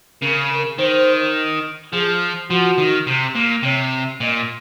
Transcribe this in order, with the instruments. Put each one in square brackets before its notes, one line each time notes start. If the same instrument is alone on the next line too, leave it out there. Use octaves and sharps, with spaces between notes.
[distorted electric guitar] C#3 [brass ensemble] A#4
[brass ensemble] A#4
[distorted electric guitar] D#3 [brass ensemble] C5
[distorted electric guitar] F3 [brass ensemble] G#4
[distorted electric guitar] F3 [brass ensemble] F#4
[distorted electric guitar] D#3
C3
A#2
[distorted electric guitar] C3 [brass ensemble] C#5
[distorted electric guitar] A#2 [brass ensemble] D#5